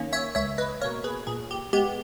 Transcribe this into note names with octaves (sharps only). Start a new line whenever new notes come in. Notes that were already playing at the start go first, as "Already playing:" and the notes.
Already playing: D#3 A#3 C#4
C#5 E5
C#2 C#5 E5
B4 D#5
B2 A#3 A#4 C#5
G#4 B4
A#2 G#4
G4
G#3 B3 G4